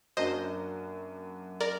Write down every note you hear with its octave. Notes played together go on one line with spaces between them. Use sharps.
F#2 F#3 A#3 D4 C5 D#5
A#4 D5